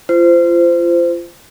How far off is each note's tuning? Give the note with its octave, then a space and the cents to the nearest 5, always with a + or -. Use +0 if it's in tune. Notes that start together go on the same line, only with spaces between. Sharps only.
F4 -30 C5 -20